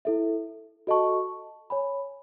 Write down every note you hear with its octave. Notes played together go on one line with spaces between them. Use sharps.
E4 A4 E5
F#4 A4 D#5 A5 C#6
C#5 G#5 B5